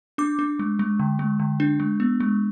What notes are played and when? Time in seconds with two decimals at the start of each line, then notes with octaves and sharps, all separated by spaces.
0.18 D4 D6
0.39 D4
0.59 G#3
0.79 G#3
0.99 D3
1.19 G#3
1.40 D3
1.60 D4
1.80 G#3
2.00 B3
2.20 G#3